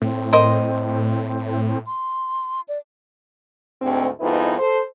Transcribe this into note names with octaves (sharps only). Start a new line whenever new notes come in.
A2 C4
A#4 C5 D#5
C6
D5
D2 G#2 C4
F2 G#2 B3 D#4 E4 B4
A4 C5